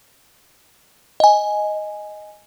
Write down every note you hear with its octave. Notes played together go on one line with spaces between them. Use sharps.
D#5 G#5